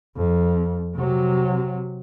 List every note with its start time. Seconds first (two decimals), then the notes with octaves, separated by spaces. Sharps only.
0.17 F2
0.96 C3 F#3